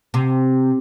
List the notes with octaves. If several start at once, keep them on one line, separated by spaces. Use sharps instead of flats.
C3